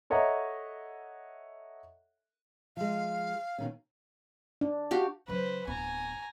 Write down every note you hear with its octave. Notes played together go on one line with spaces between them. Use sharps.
A4 C#5 D#5 E5 F#5 A#5
F3 G#3 F5
B2 D#3 C#4
D4
F#4 G4 F5
C#3 F#3 B4 C5
D1 B3 G#5 A#5